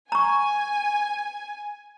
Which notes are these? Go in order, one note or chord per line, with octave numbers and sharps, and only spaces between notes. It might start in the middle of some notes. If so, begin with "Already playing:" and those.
G#5 A#5 C#6